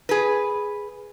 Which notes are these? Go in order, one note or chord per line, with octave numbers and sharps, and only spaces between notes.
G#4 B4